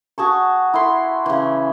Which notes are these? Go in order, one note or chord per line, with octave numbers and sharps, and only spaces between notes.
F#4 G#4 A5 C#6
E4 A4 B5 C6
C#3 E3